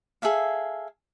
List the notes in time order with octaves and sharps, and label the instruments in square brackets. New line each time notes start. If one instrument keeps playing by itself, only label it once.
[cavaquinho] G#4 A4 E5 F5